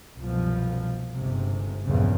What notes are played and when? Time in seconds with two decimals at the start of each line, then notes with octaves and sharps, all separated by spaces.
0.18 C2 F#2 B2 F3
1.11 G1 G#2 C3
1.84 A#1 E2 G2 C#3